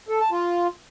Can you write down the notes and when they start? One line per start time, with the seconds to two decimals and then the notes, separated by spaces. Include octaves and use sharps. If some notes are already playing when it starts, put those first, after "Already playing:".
0.08 A4
0.20 A5
0.31 F4